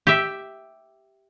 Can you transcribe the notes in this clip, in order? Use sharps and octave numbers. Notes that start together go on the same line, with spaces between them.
G4 E5